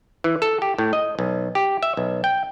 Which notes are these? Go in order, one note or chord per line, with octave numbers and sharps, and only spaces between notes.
E3
A4
G4
A2
D#5
B1
G4
E5
B1
G5